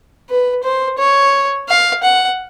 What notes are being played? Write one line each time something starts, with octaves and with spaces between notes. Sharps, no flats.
B4
C5
C#5
F5
F#5